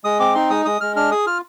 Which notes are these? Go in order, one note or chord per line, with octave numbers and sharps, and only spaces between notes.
G#3 D#6
C4 D6
D#4 C6
G#3 D#6
G#3 D#6
G#3 F6
D4 F6
G#4 D#6
F4 F6